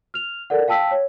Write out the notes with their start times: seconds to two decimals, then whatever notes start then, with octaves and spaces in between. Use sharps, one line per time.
0.14 F6 F7
0.50 A4 A#4 D5 F#5
0.68 F5 G5 A5 E6 B6
0.91 C#5